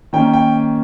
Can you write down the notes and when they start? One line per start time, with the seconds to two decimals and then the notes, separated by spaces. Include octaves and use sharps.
0.13 D#3 A#3 C#4 G5
0.34 G5